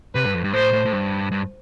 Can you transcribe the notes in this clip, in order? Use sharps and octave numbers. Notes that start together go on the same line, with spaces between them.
C3 B4
G2
F2
G2
A2 C5
A2
A2
G2
G2